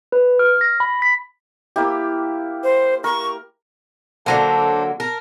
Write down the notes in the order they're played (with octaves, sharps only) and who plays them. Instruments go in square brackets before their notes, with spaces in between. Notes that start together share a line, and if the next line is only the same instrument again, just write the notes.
[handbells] B4
F6
A#6
B5
B6
[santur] A#3 E4 G4
[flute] C5
[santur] A#4 [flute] C#6
[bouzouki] D3 F#3 A#3 [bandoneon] D4 A4 C5
[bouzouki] A#4 [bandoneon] A5 F6